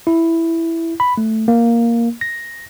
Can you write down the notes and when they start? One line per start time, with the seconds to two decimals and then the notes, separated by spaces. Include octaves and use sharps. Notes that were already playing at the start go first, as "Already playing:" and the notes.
0.07 E4
1.00 B5
1.18 A3
1.48 A#3
2.21 A#6